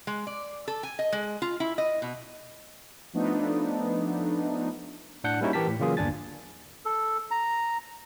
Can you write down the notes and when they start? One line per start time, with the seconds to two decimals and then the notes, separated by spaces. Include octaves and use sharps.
0.07 G#3
0.27 D5
0.68 A4
0.83 G#5
0.99 D#5
1.13 G#3
1.42 F4
1.60 E4
1.78 D#5
2.02 B2
3.14 F3 A3 B3 D4 D#4
5.24 A2 D4 F#5 G6
5.41 G3 A#3 C#4 D#4 E4 F#4
5.53 E3 G4 A#4 A5 B6
5.67 A2
5.79 C#3 E3 F#3 A#3 F4 G#4
5.97 G1 D#2 D4 G#5 A6
6.85 A4
7.31 A#5